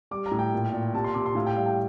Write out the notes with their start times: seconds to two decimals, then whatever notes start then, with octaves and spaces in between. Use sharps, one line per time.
0.11 G3 D6
0.26 A#5
0.32 A2
0.39 G5
0.53 A#2
0.73 A#2
0.94 C3 A5
1.04 C6
1.14 C3 D6
1.26 C6
1.35 A2 F5
1.47 G5
1.56 G3 F5
1.66 G5